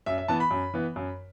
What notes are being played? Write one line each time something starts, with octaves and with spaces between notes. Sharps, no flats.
F#2 E5
E5
E3 B3 A5
B5
F#2
E3 B3
F#2